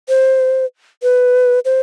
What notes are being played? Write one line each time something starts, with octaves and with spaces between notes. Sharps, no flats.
C5
B4
C5